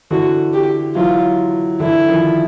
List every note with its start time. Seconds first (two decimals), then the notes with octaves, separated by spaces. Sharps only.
0.11 D3 E3 F#4
0.53 G4
0.95 E3 F#3 F4
1.80 D3 E3 E4
2.08 D#3 F3